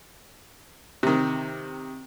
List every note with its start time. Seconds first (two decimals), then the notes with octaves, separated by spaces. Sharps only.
1.03 C3 D#3